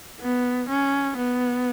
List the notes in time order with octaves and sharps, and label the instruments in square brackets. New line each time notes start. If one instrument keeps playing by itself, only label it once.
[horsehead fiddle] B3
C#4
B3